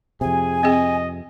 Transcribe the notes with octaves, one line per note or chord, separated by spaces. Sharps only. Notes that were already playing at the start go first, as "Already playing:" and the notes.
F2 C3 G#4 G#5
C4 G#4 D#5